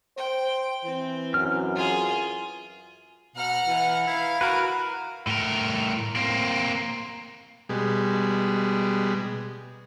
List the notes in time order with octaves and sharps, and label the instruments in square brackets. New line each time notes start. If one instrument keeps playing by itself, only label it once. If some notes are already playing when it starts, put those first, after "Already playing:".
[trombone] C5 [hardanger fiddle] G5
[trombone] E3 [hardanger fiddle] C4
[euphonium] F#2 [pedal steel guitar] F6
[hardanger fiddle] F4 G#4
[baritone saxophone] B2 [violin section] F#5 A#5 F6
[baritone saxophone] E3
[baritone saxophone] E4 [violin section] F5
[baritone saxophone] F#4 [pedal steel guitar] A#4 B4
[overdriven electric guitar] A2 A#4
A#3 C4
[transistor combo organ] B2 G3 G#3